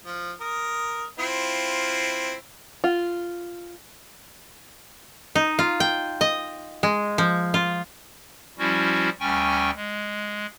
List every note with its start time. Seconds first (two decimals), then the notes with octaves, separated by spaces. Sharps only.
0.06 F3
0.41 A#4 D#6
1.19 C4 E4 F4
2.84 F4
5.35 D#4
5.59 F4
5.80 G5
6.21 D#5
6.83 G#3
7.18 F3
7.54 F4
8.58 F3 G3 C#4 E4 F#4
9.20 D2 G3 C#4 G5 G#5 C#6
9.76 G#3